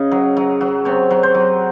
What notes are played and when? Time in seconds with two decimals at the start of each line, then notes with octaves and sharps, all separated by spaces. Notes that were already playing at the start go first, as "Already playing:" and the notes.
Already playing: C#3 D#5
0.11 F#3
0.37 F#3
0.61 F#3
0.85 C3 C#5
1.10 F#3
1.23 C5
1.35 F#3